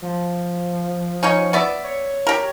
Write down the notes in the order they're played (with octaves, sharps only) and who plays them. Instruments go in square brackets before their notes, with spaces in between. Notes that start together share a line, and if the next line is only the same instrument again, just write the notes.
[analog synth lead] F3
[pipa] C#4 D#4 C#5
B3 D5 E5
[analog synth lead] C#5
[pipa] G4 A#4